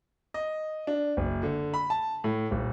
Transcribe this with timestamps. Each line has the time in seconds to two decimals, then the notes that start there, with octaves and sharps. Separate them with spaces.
0.34 D#5
0.87 D4
1.17 F#1
1.43 D3
1.74 B5
1.90 A5
2.24 A2
2.51 D#1